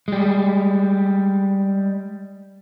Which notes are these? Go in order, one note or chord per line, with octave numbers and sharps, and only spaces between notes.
G3 G#3